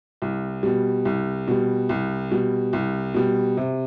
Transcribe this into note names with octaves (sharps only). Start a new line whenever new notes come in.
C2
B2 G3
C2
B2 G3
C2
B2 G3
C2
B2 G3
C3